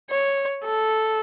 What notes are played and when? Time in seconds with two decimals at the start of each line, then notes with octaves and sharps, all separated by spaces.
0.11 C#5
0.64 A4